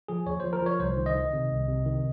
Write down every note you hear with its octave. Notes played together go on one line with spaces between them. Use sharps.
F3 G#4
D#2 C#5
F3 C5
A#4
F3 C#5
C2 C5
D#3
D#5
D#3
C3
C2
C3
D#3